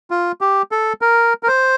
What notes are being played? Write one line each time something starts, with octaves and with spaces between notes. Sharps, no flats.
F4
G4
A4
A#4
A#4
C5